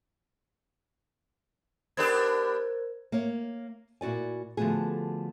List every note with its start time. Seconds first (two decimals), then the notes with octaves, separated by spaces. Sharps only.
1.97 B3 D4 G4 A#4 C5 G#6
3.12 A#3 C#5
4.01 A#2 E4 F#4 D5 G#5
4.57 D3 F3 A3 B3 F#4 G#4